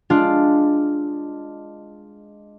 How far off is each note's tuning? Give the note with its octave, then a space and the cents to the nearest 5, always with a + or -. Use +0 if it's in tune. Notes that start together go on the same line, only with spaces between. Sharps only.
G#3 +0 D4 +0 F4 +0